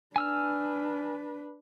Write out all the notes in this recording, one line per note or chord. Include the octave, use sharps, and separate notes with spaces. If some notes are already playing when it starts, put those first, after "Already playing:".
D4 B4 G#5 E6 F6